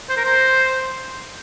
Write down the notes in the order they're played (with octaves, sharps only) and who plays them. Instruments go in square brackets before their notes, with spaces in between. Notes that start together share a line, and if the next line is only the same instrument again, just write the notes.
[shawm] C5
A#4
C5